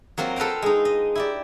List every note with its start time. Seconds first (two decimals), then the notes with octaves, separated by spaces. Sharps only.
0.18 F#3 A#3 C4 F4
0.36 A4 B4 F5 G5 A#5
0.62 G#3 D#4
0.85 D#5
1.15 E4 G4 D5